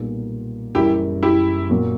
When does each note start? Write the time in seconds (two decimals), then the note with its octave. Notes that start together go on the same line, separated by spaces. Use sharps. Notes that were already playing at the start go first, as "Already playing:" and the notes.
Already playing: B1 A#2 G3 B3
0.75 F#1 F#2 E3 G3 E4 G4
1.23 E4 G4
1.70 A#2 F#3 A#3